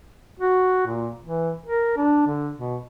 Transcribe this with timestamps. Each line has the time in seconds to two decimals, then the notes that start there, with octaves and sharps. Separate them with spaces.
0.40 F#4
0.86 A#2
1.23 E3
1.66 A#4
1.97 D4
2.27 D3
2.57 B2